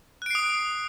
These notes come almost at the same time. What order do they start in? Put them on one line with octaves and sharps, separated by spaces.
F#6 D7 C7 D#6